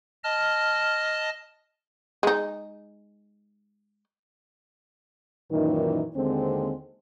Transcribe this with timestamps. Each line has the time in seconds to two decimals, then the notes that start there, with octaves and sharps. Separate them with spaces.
0.24 D#5 A5 F6
2.23 G#3 D#4
5.51 F#2 A#2 D#3 E3 D#4
6.16 D#2 D3 G#3 C4